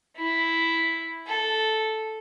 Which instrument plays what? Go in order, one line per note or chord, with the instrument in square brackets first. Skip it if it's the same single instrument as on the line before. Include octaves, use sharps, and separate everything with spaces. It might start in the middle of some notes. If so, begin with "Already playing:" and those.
[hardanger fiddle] E4
A4